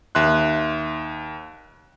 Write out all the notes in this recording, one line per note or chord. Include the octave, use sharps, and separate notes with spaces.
D#2 E5 C6 F#6